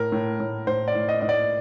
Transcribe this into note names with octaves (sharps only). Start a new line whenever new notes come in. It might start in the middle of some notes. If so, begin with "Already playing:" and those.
Already playing: A2 A#4
A2
A2
A2 C5
D5
A2
D#5
A2 D#5
D5